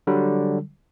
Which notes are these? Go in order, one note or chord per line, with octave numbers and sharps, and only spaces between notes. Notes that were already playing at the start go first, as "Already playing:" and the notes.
D3 F#3 G3